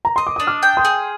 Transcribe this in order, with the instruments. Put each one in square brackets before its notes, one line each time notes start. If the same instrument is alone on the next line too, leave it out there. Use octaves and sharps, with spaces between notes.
[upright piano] A#5
[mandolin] D#5 [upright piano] C6
[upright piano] D6
[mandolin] D4 [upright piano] D#6
[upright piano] D6 F6
[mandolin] G5
[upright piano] C6 D#6
[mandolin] G#4